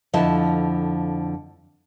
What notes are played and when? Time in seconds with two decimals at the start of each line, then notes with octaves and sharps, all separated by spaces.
0.13 F2 D3 F3 E4 D#5 A5